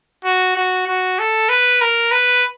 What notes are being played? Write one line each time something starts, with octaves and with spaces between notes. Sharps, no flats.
F#4
F#4
F#4
A4
B4
A#4
B4